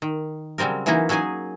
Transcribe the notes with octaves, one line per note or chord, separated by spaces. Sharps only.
D#3
C#3 F#3 G3 C4 A#4
E3 F#3 A#3 C#4 D#4 E4
F#3 C#4 D#4 G#4 G#5